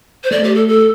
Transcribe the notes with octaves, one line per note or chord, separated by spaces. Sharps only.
C5
A3 D5
G4
A4
A4